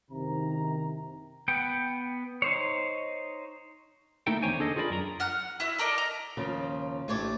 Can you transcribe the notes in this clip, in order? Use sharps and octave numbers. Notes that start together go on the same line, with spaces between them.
F#1 C3 D#3 A#5
B3 F#5 G5
D#4 C5 C#5
A3 A#3 D#4 E4 A4 G5
E2 D3 C5 C#5 G5 G#5
D4 G#4 A4 D#5
F4 G#4 A#4 D5 G#5 B5
F#2 A#4 A#5
F#5 F6 F#6
E4 F#4 E5
A4 A#4 D5 D#5
A#5
D#2 C#3 F3
A1 A3 D4 G4 C#5 D5